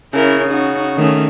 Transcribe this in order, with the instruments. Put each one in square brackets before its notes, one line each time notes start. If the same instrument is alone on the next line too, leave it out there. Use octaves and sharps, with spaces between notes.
[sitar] C#3 [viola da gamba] C#4 E4 A#4
[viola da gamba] D#4 F#4
D#3 A3 C#4